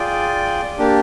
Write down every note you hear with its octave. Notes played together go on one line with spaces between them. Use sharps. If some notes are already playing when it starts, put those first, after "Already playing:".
Already playing: F4 G#4 D5 G5
A#3 D4 G4